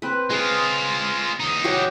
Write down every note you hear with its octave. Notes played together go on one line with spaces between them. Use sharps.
C4 B4
G#3 F4 G#4
E2 D#4
F#4 G4 C#5